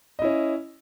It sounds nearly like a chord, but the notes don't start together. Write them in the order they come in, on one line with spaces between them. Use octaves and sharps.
D#5 E4 C#4